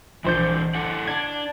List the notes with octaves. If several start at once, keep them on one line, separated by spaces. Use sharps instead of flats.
A#1 E3 D4 C5 G6
E4 A4 F#5
D4 G#6